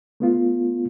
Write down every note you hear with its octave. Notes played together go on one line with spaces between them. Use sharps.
A3 B3 F4